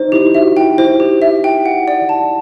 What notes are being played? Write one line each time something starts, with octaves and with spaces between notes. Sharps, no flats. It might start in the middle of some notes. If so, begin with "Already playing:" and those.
Already playing: D#4 C5
E4 G4
F#4 E5
E4 G5
E4 C5
G4
E5
G5
F#5
D5
A5